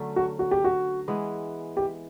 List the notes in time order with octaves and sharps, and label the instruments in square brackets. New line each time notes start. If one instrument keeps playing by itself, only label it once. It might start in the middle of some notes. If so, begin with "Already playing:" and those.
Already playing: [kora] D3 F#3 A3 C#4
[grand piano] F#4
F#4
G4
F#4
[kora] E3 G#3 B3
[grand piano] G4